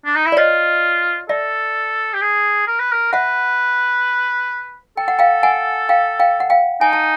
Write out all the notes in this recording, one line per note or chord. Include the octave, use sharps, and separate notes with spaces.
D4
D#4
E4
D5
F4 C#5 D#5
A4 D5 E5
G4
G#4
A#4
B4
A#4
B4 E5 F#5
A4 G5
F#5
F5 G5
F#5 G#5
F5 G5
F5 G5
F#5
F5 G5
D#4 G#5
A5